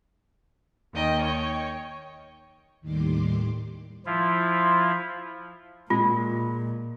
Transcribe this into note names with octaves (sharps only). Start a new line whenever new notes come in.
D#2 D#3 D#5 G5
C#5 G5
D#2 A2 D#3 G3 C6 D6
F3 E4 F4
A#2 G#3 F4